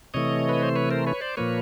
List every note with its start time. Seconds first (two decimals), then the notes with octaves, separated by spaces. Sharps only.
0.14 C3 E3 A3 C#5 D#5
0.49 B4
0.63 C5
0.76 B4 C#5
0.91 A#4 C5
1.07 B4 C#5
1.21 C5 D5
1.37 A#2 F3 A#3 B4 C#5